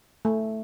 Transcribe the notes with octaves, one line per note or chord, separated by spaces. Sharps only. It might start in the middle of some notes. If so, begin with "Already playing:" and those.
A3